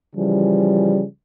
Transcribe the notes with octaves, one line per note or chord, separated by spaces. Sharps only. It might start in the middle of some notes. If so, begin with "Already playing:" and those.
C#3 E3 F3 G3